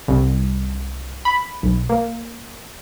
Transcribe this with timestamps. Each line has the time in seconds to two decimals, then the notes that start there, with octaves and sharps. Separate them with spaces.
0.08 C2
1.25 B5
1.63 B1
1.89 A#3